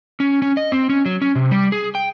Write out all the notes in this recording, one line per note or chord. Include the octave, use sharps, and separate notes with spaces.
C#4
C#4
D#5
C4
C#4
F#3
C#4
C3
G3
G#4
G5